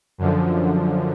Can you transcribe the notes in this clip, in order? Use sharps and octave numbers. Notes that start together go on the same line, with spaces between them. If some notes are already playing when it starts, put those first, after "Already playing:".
F#2 D3 F3